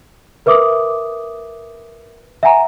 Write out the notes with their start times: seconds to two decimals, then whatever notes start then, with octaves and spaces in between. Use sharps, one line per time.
0.46 A#4 B4 E5 D6 D#6
2.43 E5 F#5 G#5 A#5